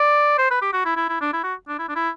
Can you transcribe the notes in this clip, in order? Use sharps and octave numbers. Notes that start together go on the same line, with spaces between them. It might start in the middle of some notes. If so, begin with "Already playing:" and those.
Already playing: D5
C5
B4
G4
F#4
E4
E4
E4
D4
E4
F#4
D4
E4
D4
E4